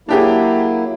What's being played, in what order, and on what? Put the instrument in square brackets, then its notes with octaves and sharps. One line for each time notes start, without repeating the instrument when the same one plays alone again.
[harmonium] F#3 A#3 E4 [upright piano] D4 G4 G#4